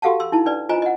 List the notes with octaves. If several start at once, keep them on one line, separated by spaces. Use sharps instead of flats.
F#4 G4 A4 F5 F#5 A5
C6 E6
D#4 E4 A5
D4 B4 D5
F4 C5 D#5 G#5 A#5
D#5 F#5